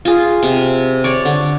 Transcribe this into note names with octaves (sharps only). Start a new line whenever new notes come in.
F4 G#4
C3
C#5 D5
D3